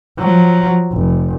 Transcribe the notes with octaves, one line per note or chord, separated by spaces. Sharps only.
F3 F#3
F1